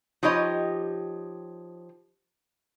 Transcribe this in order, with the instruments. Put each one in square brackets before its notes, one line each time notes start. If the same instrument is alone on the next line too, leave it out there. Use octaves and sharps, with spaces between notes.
[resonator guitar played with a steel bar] F3 D#4 G4 C#5 D#5